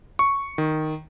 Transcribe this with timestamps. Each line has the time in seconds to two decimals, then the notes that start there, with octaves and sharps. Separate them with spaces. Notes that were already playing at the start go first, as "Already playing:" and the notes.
0.19 C#6
0.58 D#3